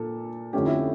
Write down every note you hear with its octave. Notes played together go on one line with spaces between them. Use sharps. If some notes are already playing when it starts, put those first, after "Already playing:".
Already playing: A#2 F3 A4
F2 D3 A3 C#4 G4
E4